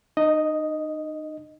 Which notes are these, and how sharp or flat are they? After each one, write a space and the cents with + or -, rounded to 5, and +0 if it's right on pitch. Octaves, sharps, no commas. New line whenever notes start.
D#4 -35 D#5 +0